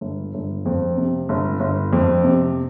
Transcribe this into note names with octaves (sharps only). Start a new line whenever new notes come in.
G1
G1
F2
C3
G1
G1
F2
C3